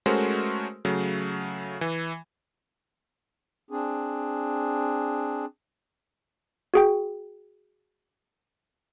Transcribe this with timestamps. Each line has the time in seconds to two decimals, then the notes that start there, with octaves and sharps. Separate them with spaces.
0.06 G#3 A3 C#4 F#4 A#4 C5
0.85 C#3 F#3 A3
1.81 E3
3.71 C4 D4 G#4
6.74 F#4 G#4 G5